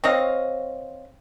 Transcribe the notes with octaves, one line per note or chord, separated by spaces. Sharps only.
C4 C#5 D#5 F5